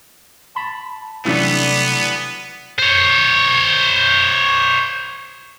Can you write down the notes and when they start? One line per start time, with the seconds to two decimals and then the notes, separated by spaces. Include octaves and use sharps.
0.55 A5 B5
1.25 C3 E3 F#3 G3 A3 B3 D4
2.79 C5 C#5